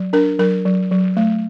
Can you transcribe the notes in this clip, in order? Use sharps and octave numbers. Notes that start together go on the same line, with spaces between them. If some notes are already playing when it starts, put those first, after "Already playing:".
Already playing: F#3
D4 A#4
F#3 A#4
F#3
F#3
A3